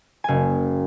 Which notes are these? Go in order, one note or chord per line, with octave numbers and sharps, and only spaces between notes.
F#1 G#5